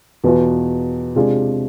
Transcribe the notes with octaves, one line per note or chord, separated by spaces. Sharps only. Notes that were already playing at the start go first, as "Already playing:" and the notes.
E2 B2 B3 F4
C3 G#3 D4 F4 G#4